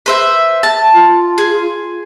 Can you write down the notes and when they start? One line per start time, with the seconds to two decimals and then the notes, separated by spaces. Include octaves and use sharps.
0.06 B4 C5 E5
0.63 A5
0.94 F4
1.38 G#4